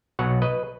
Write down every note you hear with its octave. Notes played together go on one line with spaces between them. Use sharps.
B1 B2 F#3 C#5 F#5
B4 D#5